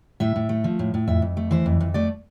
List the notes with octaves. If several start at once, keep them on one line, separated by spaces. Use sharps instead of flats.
A2 E5
A2
A3
F3
A2
A2
F2 E5
F2
A3
E3 C5
F2
F2
A3 D5